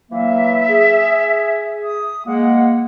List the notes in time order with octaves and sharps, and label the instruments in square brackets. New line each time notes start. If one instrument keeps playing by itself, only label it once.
[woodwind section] E3 F#3 A#3 [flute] E5
[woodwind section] G#4
[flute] D#6
[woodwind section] G#3 A#3 [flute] F#5